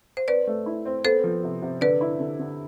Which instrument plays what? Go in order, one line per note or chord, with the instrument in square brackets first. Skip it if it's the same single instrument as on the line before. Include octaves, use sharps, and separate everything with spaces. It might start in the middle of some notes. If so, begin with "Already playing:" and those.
[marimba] C5
[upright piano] C4 [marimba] B4 D5
[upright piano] A3
E4
C4
[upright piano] B3 [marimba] A4 C5
[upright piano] F3
C3
C3
[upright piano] D3 [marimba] B4 D5
[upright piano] E4
D3
D3